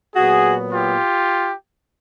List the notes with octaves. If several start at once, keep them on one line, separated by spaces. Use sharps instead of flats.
A#2 F#3 B3 F#4 G#4
F4 G4